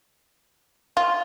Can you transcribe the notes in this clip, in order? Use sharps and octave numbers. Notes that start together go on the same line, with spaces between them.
F4